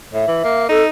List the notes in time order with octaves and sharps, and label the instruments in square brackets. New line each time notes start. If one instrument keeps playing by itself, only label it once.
[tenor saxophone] A2 [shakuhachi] E5
[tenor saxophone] E3
A#3
[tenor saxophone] D#4 [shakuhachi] A4